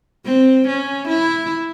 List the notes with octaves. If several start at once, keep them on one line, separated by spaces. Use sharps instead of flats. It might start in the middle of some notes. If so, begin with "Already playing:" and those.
C4
C#4
E4